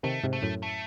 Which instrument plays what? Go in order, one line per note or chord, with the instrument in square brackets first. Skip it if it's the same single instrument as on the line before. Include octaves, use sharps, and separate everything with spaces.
[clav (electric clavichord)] C3 D#3 [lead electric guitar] A3
[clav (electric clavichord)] G#2 C3
[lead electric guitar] A3
[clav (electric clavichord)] F#2 A2
[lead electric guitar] A3